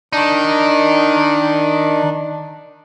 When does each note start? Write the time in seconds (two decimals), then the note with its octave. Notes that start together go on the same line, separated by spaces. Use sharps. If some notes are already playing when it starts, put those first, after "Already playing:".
0.13 D#3 D4 D#4